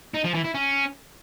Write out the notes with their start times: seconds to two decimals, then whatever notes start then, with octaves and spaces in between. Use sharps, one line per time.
0.14 D#4
0.24 F3
0.34 E3
0.44 E4
0.54 C#4